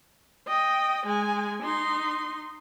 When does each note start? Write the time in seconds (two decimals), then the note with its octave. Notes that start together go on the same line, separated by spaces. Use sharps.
0.47 D#5 G5
1.06 G#3 G#5
1.63 D#4 C6